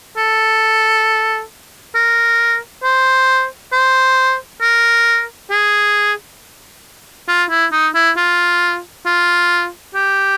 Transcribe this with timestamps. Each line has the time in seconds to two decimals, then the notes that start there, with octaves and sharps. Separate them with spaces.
0.17 A4
1.95 A#4
2.83 C5
3.73 C5
4.61 A#4
5.50 G#4
7.28 F4
7.50 E4
7.72 D#4
7.95 E4
8.17 F4
9.06 F4
9.95 G4